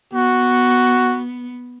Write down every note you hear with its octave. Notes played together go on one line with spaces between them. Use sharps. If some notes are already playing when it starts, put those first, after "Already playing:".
B3 F#4